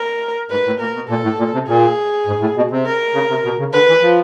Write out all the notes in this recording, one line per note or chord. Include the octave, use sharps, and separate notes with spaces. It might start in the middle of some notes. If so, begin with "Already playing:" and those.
Already playing: A#4
G#2 B4
A2
A#2 A#4
B2
A#2 A4
A2
A#2
C3
A#2 G#4
G#2
A2
B2
C3
A#4
C#3
C3
B2
C#3
D3 B4
E3
F3